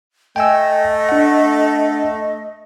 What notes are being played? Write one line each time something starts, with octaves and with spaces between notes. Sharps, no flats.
A3 D#5 G5 G#5 E6
D4 F#5